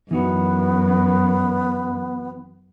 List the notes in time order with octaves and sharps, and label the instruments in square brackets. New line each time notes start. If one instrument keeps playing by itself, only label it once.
[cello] F#2 [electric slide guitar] E3 D#4 F#4 [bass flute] B3